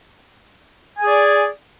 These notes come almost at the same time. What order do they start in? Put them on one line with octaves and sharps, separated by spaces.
G#5 G#4 D5